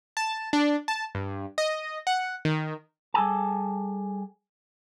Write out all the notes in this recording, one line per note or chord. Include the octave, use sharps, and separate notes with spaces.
A5
D4
A5
G2
D#5
F#5
D#3
G3 G#4 A4 G#5 A5